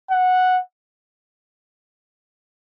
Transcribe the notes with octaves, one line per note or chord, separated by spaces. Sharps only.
F#5